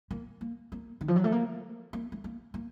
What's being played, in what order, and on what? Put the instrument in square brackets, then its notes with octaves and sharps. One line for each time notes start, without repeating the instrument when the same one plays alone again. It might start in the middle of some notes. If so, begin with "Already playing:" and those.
[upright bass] A#3
A#3
A#3
D#3
F3
F#3
A3
A#3
A#3
A3
A#3
A#3